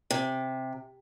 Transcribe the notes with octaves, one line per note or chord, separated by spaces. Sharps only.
C3